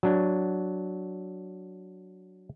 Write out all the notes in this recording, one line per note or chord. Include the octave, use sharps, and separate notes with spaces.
F#3 D4